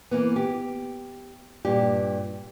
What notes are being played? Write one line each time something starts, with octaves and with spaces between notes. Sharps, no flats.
E3 A#3 B3
G4
G2 A#2 G4